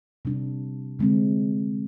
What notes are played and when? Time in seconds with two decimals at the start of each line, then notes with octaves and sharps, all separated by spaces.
0.25 C3 G3 D4
0.99 D3 G#3 C4